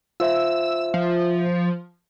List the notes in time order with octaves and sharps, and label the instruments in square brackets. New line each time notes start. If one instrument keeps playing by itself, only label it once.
[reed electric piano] F4 C5 E5 [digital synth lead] E6
[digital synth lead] F3